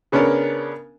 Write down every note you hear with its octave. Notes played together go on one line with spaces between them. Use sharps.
C#3 B3 C#4 D4 A#4